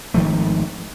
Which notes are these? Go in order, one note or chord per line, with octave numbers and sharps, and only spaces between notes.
G#1 D#3 F3 A3